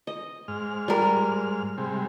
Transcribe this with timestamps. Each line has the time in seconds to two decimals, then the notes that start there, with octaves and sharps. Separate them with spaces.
0.07 D#5
0.48 G#2 F6
0.88 G3 A#4
1.78 C3 G3 G#3